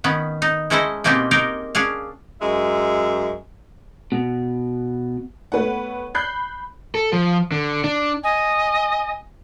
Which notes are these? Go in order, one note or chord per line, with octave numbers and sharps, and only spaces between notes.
D#3 B3 C#4
D#4
G#3 C#4 E4 A4 C5 D#5
B2 A#3 C4 C#4 D#4 G4
D#4 G4 G#4 A#4
C#4 D4 G#4 F5
F#2 G#3 E5
B2
A3 B3 B4 C#5 F#5
B5 F#6 G6 C7
A4
F3
D3
D4
D#5 G#5